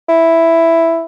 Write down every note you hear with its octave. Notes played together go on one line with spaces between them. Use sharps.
E4